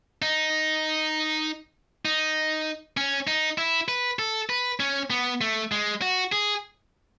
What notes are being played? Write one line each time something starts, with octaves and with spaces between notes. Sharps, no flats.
D#4
D#4
C#4
D#4
E4
B4
A4
B4
C#4
B3
A3
G#3
F#4
G#4